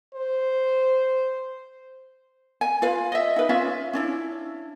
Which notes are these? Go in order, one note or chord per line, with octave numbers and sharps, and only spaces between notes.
C5
G#5
F4 B4 F5
D#5 E5
D#4 B4
C#4 F4 E5 F5
C#4 D4 E4